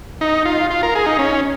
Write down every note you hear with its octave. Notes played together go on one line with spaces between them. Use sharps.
D#4
F4
F4
A#4
G#4
D#4
C#4